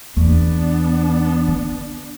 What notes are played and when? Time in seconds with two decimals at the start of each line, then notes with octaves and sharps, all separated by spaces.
0.17 E2 B3 D4
1.48 D3